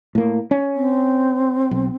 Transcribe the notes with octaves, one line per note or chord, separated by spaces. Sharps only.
A2 A#3
C#4
C4
B1